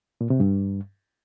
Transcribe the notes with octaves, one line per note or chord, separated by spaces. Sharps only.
A#2
C3
G2